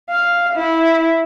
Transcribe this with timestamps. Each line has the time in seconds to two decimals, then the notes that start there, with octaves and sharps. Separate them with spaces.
0.10 F5
0.56 E4